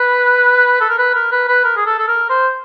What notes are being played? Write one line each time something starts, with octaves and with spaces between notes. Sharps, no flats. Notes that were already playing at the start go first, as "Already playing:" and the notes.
Already playing: B4
A4
A#4
B4
A#4
B4
B4
A#4
G#4
A4
A4
A#4
C5